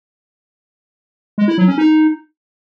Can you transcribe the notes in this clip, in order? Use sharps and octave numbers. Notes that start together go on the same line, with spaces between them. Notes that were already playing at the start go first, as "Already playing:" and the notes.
G#3
E4
F#3
C#4
D#4